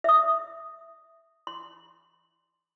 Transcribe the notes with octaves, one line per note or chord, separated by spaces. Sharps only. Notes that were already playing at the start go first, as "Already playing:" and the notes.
E5 D#6
C6